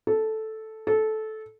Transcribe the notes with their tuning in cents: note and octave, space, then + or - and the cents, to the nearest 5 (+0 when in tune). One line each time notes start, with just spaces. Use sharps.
A4 -5
A4 -15